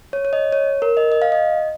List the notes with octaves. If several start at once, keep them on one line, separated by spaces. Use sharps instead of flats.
C#5
C#5
D#5
C#5
A#4
D#5
D#5
F5
D#5